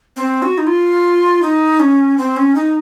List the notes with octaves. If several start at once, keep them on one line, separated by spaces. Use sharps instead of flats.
C4
F#4
D#4
F4
D#4
C#4
C4
C#4
D#4